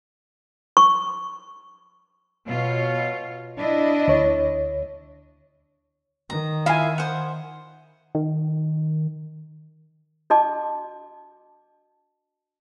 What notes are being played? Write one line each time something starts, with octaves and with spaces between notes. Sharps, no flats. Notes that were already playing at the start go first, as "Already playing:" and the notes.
C#6
B2 F4 C#5
D4 E4 D#5
D2 C#5
D#3 A#5
E4 F4 E5 F5 G#5
C5 F#5
D#3
D4 F#4 D#5 A5 D6